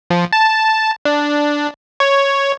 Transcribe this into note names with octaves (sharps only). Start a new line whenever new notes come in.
F3
A5
D4
C#5